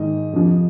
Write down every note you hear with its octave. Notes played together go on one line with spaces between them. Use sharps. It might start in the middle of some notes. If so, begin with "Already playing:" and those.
Already playing: G#2 D#3 D#5
F2 C3 F3